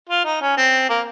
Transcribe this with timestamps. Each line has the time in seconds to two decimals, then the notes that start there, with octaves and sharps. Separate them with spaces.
0.09 F4
0.25 D#4
0.42 C#4
0.57 C4
0.89 A#3